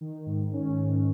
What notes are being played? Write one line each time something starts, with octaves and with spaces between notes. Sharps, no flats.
D#3
G#2
C#4
G#2